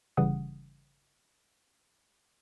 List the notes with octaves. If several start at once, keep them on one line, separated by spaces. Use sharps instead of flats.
G1 C#3 E3 G3 F#5 D#6